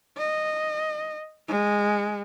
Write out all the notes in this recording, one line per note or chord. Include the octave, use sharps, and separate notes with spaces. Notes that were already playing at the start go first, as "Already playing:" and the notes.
D#5
G#3